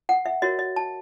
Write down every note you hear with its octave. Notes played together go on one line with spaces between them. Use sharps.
F#5
E5
F#4 A#4 C#5 D#5
D#5
A5